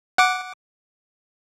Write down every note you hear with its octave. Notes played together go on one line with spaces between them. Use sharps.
F#5 D6